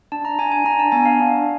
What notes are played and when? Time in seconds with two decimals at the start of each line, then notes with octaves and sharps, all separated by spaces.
0.12 D4 A5
0.25 A#5
0.39 D4 G#5
0.52 G#5
0.65 D4 A#5
0.79 A5
0.92 B3 G#5
1.05 F5
1.20 D4